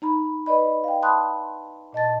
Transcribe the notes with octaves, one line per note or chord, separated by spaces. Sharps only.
D#4 A#5 B5
B4 D5 D#5 B5
F5 G5
A5 B5 C6 D#6 F#6
A#2 D#5 A5 A6